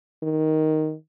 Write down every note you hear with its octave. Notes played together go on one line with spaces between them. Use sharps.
D#3